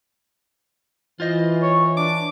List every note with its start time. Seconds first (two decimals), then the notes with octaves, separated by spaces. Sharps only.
1.20 E3 F4 C5 D#5
1.62 C#5
1.97 D4 D6